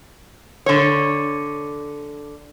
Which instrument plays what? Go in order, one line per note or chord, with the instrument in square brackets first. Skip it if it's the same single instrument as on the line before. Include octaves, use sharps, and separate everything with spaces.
[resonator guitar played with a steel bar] D3 C#5